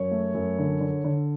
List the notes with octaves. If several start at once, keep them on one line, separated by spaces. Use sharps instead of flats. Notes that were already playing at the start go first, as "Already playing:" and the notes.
Already playing: F#2 C#5
A3
F#2
D3
D3
D3